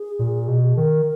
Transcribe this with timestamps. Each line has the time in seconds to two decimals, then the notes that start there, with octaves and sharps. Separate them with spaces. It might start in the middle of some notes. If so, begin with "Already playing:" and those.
Already playing: G#4
0.19 A#2
0.48 B2
0.77 D#3 A#4